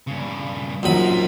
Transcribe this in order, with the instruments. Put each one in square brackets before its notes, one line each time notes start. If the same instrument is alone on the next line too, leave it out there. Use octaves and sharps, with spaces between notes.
[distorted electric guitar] G2 C#3
[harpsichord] A#1 F#2 B5 [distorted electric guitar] D#4 C5